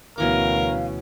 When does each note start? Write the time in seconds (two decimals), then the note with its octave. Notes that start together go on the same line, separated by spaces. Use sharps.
0.18 D2 B2 E3 C#4 A#4 F5 D6